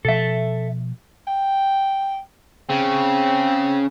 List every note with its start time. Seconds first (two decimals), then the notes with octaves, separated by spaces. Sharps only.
0.05 B2 F3 A4 E5
1.27 G5
2.69 C#3 C4